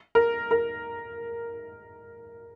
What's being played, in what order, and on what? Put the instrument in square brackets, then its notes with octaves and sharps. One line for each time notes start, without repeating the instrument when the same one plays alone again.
[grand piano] A#4
A#4